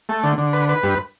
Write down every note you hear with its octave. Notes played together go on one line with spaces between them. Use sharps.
A3
D3
D3
B4
B4
G2